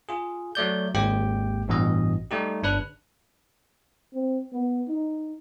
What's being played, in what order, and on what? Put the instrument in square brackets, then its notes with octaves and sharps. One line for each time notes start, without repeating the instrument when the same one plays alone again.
[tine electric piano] F4 G#4
F#3 A3 D5 G6
G#1 D#2 G#3 G4 G5
A1 G2 B2 E3 D#5
G3 A3 D#4 G4
G1 D4 B4 F#6
[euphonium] C4
B3
D#4